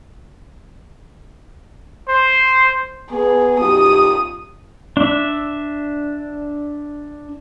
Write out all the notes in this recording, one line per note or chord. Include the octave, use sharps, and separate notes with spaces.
C5
B3 G#4
B1 F#2 F4 G4 D#6
D4 E5